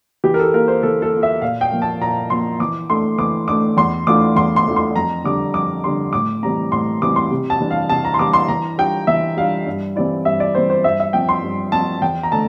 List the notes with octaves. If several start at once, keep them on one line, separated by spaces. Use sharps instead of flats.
E3 G4
A#4
A4
A#3 F4 A#4
C5
E3 A4
A4
A#3 F4
E5
A#2 F5
G5
F3 A#3
A5
A#2 A#5
F3 A#3 C6
E3 D6
A3 D4 C6
E3 D6
A3 D4 D6
E2 C6
E3 A3 D4 F4 D6
E2 C6
C6
E3 A3 D4 F4
C6
F2 A#5
D3 G3 D4 D6
F2 D6
D3 G3 D4 C6
A2 D6
E3 G3 C4 A#5
A2 C6
E3 G3 C4 D6
C6
C3
A5
E3 G3 D4
F5
C3 A5
A#5
C6
E3 G3 D4 D6
C6
E3 A#5
G3 D4 F4 G5
E3 E5
G3 D4 F4 F5
G2
E3 G3 C4 E4 D5
G2 E5
D5
E3 G3 C4 E4 C5
C5
G2 E5
E5
F3 C4 G5
C6
G2
F3 C4 A5
E2 G5
A#5
D3 A3 A5